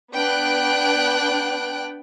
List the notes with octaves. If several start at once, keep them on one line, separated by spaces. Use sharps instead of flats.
B3 D4 G5 F#6 D7